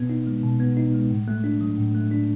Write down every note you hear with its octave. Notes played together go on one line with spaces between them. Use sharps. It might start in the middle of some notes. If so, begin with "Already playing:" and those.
Already playing: B2 B3
D#4
G#3
B2
B3
D#4
G#3
A2
A3
D4
F#3
A2
A3
D4